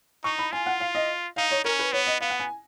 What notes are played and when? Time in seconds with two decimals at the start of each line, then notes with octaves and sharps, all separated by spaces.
0.24 D#4 C#6
0.39 B5
0.52 F4 G#5
0.66 F#5
0.80 F5
0.95 D#5
1.36 D#4 F5
1.51 C#5
1.65 C#4 A#4
1.79 B4
1.92 B3 C#5
2.07 D#5
2.21 B3 F5
2.30 F#5
2.40 G#5